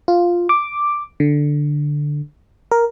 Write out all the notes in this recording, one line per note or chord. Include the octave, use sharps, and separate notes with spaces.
F4
D6
D3
A#4